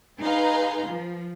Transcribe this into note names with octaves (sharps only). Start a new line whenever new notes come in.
D#4 G#4 B4 F5 A#5 C6
F3